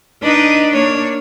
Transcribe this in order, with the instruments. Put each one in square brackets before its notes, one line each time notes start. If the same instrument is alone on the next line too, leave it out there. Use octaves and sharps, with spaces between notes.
[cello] D4 [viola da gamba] D#4 B4 D#5
[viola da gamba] A#3 C#5